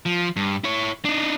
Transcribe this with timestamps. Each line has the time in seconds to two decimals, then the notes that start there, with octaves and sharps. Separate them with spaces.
0.06 F3
0.36 G2
0.64 E4 C#5
1.05 D4 D#4